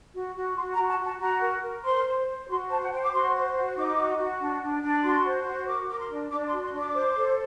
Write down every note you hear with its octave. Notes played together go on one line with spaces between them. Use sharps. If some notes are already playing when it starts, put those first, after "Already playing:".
F#4
F#4
F#4 C6
A#5
F#4
A5
F#4 A5
F#4 A#5
A#4
A#4
C5 C6
C5
C5
F#4 C6
C5 A5
F#5
C5 G5
D6
F#4 C6
C5
F#4
D#4 D6
F#4
F#4
D4
D4
D4
F#4 C6
C5
F#4
A#4 D6
A#4 D6
C6
D4
D4 D6
C6
F#4
C6
D4
D6
C5
A4